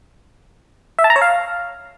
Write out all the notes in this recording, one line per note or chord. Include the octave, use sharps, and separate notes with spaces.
E5
A5
A#5
C#5
F5